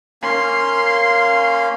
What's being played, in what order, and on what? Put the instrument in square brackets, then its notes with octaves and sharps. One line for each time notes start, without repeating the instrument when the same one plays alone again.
[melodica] A#3 C#4 F5 [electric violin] C6